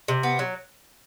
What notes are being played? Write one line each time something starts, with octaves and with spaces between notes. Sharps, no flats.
C3
B3
F#3